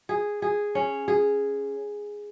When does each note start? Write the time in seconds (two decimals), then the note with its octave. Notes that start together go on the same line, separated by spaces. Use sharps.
0.09 G#4
0.42 G#4
0.75 C#4
1.08 G#4